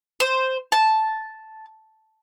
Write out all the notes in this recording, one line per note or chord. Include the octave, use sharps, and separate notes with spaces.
C5
A5